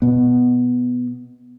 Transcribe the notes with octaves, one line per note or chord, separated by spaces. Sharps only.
B2 B3